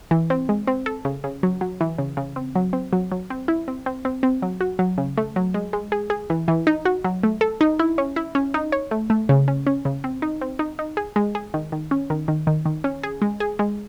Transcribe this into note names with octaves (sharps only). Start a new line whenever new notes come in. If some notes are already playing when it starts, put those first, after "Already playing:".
E3
C4
G#3
C4
A4
C#3
C#3
F#3
F#3
E3
C#3
C#3
C4
F#3
C4
F#3
F#3
C4
E4
C4
C4
C4
C4
F#3
F#4
F#3
C#3
A3
F#3
G#3
G#3
G#4
G#4
E3
E3
D#4
F#4
F#3
A3
A4
D#4
E4
C#4
E4
C#4
D#4
C#5
A3
A3
C#3
C#4
C#4
C#3
C4
D#4
C4
D#4
D#4
G#4
G#3
G#4
D#3
D#3
C#4
D#3
D#3
D#3
D#3
C#4
G#4
G#3
G#4
G#3